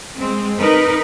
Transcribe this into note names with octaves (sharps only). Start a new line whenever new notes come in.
G#3 C4
D#4 A#4 B4